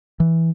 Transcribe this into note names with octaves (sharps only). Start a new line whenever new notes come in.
E3